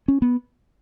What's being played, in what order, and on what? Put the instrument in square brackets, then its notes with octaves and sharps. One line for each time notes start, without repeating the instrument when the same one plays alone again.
[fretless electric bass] C#4
B3